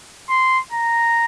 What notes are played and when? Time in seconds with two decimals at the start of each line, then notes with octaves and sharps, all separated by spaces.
0.29 C6
0.72 A#5